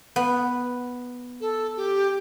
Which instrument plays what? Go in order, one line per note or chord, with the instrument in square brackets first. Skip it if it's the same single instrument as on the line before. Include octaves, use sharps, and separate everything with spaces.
[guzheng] B3
[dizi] A4
G4